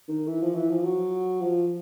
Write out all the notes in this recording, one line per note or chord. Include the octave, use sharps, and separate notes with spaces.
D#3
E3
F3
E3
F3
F#3
F3